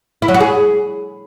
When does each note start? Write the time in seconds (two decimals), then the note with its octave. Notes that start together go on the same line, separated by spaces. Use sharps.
0.22 E4
0.28 F#3
0.34 F#4
0.40 G#4